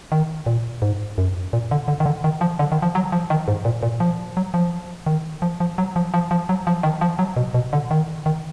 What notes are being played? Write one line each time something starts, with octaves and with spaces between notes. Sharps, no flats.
D#3
A#2
G#2
F#2
A#2
D3
D3
D#3
D3
D#3
F3
D3
D#3
F3
F#3
F3
D#3
G#2
A#2
A#2
F3
F#3
F3
D#3
F3
F3
F#3
F3
F3
F3
F#3
F3
D#3
F3
F#3
B2
B2
D3
D#3
D#3